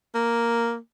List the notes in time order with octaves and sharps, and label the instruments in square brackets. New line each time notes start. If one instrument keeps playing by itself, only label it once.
[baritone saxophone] A#3